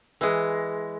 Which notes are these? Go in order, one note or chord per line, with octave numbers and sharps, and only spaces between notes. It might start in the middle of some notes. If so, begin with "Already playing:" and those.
E3 G#3